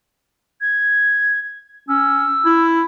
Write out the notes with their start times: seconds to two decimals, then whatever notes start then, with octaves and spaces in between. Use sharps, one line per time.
0.61 G#6
1.89 C#4 E6
2.45 E4